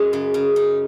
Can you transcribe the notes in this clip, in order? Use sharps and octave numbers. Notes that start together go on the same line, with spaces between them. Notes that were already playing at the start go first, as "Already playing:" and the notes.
Already playing: F#2 G#3
C#3
C#3
D#4